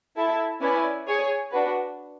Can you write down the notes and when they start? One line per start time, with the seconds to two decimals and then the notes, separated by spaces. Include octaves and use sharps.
0.16 E4 A4 E5 A5
0.61 C#4 E4 B4 D5 G#5
1.06 G#4 C#5 G#5
1.51 D4 F#4 B4